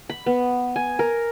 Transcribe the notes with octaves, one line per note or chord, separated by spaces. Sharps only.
B5
B3
G#5
A#4